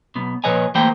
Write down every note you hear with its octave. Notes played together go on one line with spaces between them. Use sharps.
B1 B3
A#2 F3 B4 C#5 D#5 G#5
E3 A3 A#3 C5 G5